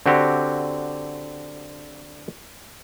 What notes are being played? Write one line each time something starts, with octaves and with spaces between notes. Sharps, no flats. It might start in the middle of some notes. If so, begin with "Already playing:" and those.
D3 C4 F#4 G4